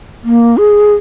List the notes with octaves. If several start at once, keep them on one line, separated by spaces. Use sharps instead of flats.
A#3
G#4